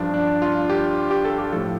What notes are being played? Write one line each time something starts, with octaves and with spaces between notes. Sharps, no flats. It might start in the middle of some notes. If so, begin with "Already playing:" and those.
Already playing: G2 F3 D4
D4
F4
G4
G4
A4
G4
A2 F3 A4